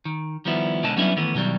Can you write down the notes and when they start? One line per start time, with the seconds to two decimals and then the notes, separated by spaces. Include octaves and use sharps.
0.05 D#3
0.45 D#3 F3 G3 B3 E4
0.83 B2 D3 G#3 D4 D#5 A5
0.96 F#3 G3 B3 C#4 D4 E4
1.17 D#3 E3 A3 B3
1.34 B2 D#3 F#3 G3